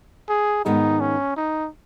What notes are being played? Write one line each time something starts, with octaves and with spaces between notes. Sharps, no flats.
G#4
G#2 D#3 B3 D#4 G#4
C#4
D#4